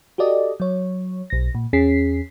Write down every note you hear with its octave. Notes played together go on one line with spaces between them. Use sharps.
F#4 G4 A4 D5 D#5
F#3 C#5
B1 A#6
A#2
E2 C#4 G#4 B6 C7